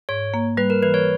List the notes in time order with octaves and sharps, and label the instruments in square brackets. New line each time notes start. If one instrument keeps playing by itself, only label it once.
[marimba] G#2 [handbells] C#5
[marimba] A#3
[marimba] G3 [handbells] B4
[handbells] A#4
[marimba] E3 [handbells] B4
[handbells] C#5